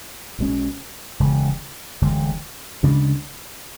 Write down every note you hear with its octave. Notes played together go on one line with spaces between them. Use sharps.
B1 B2 G#3 C#4
E1 D2 C#3 G#3
E1 D2 D3 G#3
D2 C#3 G#3 D4